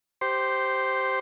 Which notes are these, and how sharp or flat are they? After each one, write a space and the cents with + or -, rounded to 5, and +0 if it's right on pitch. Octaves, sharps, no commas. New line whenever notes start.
G4 -10 C5 +0